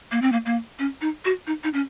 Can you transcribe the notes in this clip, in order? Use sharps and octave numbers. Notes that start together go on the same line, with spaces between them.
A#3
C4
A#3
A#3
C#4
D#4
F#4
D#4
D#4
C#4